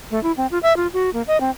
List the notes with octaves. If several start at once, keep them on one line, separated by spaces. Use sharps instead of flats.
A3
E4
C4
F4
E5
F4
F#4
A#3
D#5
C4